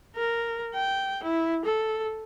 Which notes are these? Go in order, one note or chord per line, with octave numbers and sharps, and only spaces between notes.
A#4
G5
E4
A4